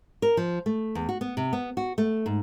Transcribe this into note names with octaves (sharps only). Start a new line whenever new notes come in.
A#4
F3
A3
E2
F#4
B3
C3
B3
F#4
A3
G#2